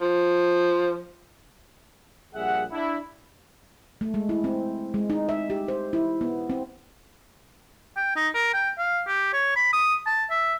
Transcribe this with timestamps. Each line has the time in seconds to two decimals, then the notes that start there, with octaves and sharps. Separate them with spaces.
0.01 F3
2.34 A#1 G3 G#4 E5 F#5
2.72 D4 E4
4.01 A3
4.14 G#3
4.29 E4
4.44 C4
4.94 G#3
5.10 D#4
5.29 E5
5.50 G4
5.68 C5
5.93 E4
6.21 B3
6.50 C4
7.97 G5
8.16 D#4
8.34 A#4
8.53 G5
8.78 F5
9.07 G4
9.33 C#5
9.56 B5
9.73 D#6
10.06 A5
10.30 E5